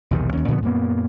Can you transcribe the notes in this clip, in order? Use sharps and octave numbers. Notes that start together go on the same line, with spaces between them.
B1 E2 C3 D#3
D#2 C#4
A#2 D3 F3 B3
F#2 A#2 A#3 B3